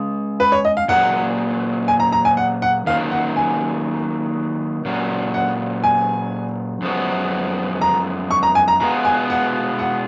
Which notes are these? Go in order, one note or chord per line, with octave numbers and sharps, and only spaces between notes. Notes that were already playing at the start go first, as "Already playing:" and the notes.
Already playing: G#3 C#4 G#4
B4
C#5
D#5
F5
A#2 F#3 A#3 C#4 G#4 F#5
G#5
A#5
A#5
G#5
F#5
F#5
D#3 F#3 A#3 C#4 F5
F#5
G#5
A#2 F#3 C#4
F#5
G#5
F#2 F3 G#3 B3 F#4
A#5
C#6
A#5
G#5
A#5
B2 G#3 B3 F4 A#5
G#5
F#5
F#5